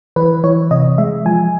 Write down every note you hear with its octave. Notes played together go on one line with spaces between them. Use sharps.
E3 B4
E3 C#5
C3 D#5
G#3 E5
F3 G#5